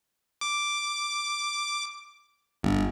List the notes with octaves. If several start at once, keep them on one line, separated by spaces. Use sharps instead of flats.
D6
G1